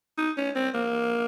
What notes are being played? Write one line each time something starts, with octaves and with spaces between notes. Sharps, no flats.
D#4
C#4
C4
A#3